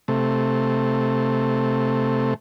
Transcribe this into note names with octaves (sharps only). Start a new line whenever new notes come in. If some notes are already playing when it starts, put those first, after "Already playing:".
C3 A3